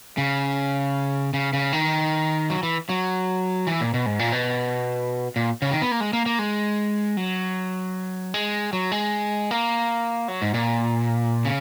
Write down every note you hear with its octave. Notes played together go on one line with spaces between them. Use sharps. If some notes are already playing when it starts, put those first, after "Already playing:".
C#3
C#3
C#3
D#3
F#3
E3
F#3
E3
A#2
B2
G#2
A#2
B2
A#2
C#3
D#3
B3
A#3
G#3
A#3
A#3
G#3
F#3
G#3
F#3
G#3
A#3
F#3
G#2
A#2
C#3